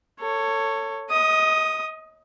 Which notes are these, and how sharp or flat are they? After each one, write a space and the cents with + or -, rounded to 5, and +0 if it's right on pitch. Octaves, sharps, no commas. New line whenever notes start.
A4 +30 C#5 +0
D#5 +30 D#6 +0